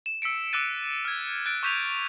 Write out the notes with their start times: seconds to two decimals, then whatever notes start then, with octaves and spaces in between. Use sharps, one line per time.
0.06 E7
0.22 E6 B6 C#7 D7
0.52 D6 E6 F#6 A6 D#7
1.05 F6 G#6
1.46 F#6 A6 D7
1.63 C#6 D6 G6 B6 D#7 F7